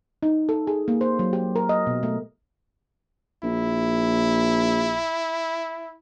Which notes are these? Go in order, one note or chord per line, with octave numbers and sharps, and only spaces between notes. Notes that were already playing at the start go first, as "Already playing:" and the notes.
D#4
A4
G#4
A#3
C5
F#3
G4
A#4
D#5
B2
A3
A#1 E4